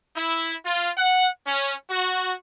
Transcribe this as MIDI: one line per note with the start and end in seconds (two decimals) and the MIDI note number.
0.16 0.55 64
0.65 0.91 65
0.97 1.28 78
1.47 1.74 61
1.90 2.33 66